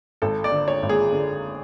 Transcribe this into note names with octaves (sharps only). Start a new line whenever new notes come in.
G#1 A4
D5
D3
C#5
G#1
G#4
D3